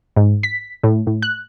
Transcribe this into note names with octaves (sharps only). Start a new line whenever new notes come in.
G#2
B6
A2
A2
F#6